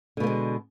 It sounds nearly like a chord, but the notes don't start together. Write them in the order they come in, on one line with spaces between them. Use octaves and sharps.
D3 B2 A#3 G#3